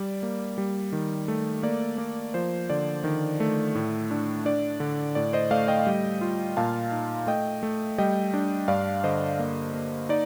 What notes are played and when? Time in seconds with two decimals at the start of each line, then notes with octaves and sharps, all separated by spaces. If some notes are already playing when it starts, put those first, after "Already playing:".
Already playing: G3 D5
0.23 A#3
0.58 G3
0.93 D#3
1.28 A3
1.63 A#3 D5
1.98 A#3
2.34 F3 C5
2.70 D3 D5
3.04 D#3
3.40 A3
3.75 A2
4.11 D4
4.45 D4 D5
4.80 D3
5.15 A2 D5
5.33 C5 D#5
5.51 A3 D5 F5
5.68 D#5 G5
5.87 G3
6.21 F4
6.57 A#2 F5 A5
6.92 D#4
7.27 A3 D#5 G5
7.63 A3
7.98 G3 D#5 G5
8.34 D4
8.68 G2 D5 F5
9.04 D3 C5 D#5
9.39 A#3
9.73 A#3
10.09 D#4 D5